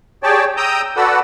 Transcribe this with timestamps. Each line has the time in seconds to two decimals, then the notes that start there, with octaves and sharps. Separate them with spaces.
0.23 G4 G#4 C#5 D5 G5 A5
0.57 G5 A#5 D#6 E6 G6
0.96 F#4 A4 B4 D5 F#5 E6